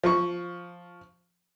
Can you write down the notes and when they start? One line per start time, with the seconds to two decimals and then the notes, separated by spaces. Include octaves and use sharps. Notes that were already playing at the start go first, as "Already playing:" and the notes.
0.04 F3 C#6